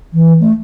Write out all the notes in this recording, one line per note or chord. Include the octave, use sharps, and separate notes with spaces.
E3
A3